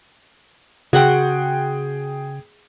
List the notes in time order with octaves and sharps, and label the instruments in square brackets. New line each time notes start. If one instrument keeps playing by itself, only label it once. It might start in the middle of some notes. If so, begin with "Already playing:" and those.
[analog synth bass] C#3 [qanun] F#4 F#5 C6 [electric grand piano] G#4 G5